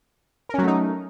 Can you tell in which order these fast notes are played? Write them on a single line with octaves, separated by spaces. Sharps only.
A#4 C#4 F#3 A3 D#4